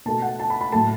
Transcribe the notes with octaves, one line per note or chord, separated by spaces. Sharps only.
B2 A3 A5
F#5
A5
B5
B5
A2 F#3 A3 A5